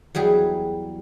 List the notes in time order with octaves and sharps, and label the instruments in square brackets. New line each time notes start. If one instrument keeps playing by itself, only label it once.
[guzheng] E2 F#3 G3 G#4